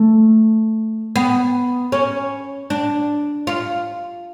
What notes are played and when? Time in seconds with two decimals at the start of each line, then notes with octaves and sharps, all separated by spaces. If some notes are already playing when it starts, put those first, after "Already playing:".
Already playing: A3
1.16 B3
1.92 C#4
2.70 D4
3.47 F4